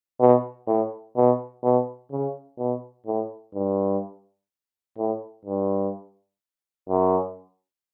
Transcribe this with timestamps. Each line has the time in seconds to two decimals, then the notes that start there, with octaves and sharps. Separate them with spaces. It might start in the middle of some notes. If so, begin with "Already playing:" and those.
0.20 B2
0.68 A2
1.16 B2
1.63 B2
2.12 C#3
2.59 B2
3.07 A2
3.55 G2
4.98 A2
5.45 G2
6.90 F#2